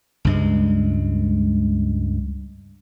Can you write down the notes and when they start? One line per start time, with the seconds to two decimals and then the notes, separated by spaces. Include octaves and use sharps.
0.25 C#2 G2 G#3